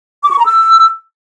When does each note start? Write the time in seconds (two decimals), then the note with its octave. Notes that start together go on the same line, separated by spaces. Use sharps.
0.23 D6
0.30 C#6
0.38 A#5
0.46 E6